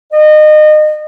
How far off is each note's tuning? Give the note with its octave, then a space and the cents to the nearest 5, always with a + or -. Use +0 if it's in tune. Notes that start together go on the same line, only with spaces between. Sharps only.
D#5 -30